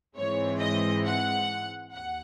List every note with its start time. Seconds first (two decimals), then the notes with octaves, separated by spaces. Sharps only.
0.16 G#2 E3 G#3 C4 C#5
0.61 D#5
1.05 F#5
1.93 D#2 F#5